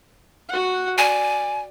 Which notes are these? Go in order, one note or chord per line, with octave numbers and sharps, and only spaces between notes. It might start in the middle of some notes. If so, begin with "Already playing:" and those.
F#4 F#5
D5 G#5